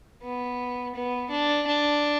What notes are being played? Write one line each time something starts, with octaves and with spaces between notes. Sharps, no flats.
B3
B3
D4
D4